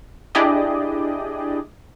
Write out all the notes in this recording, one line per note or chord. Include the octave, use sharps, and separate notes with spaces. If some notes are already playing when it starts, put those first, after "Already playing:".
D4 E4 G4 G#4 D5 D#5